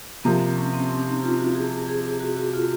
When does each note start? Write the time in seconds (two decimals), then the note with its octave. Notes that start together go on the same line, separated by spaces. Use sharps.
0.24 C3 F3 A#3 C4
0.57 C#4
0.74 C4
0.90 C4
1.06 D#4
1.22 F4
1.39 F#4
1.55 G#4
1.88 G#4
2.20 F#4
2.37 F#4
2.54 F4